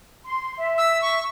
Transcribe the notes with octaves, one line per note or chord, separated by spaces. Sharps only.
C6
E5
E6
C#6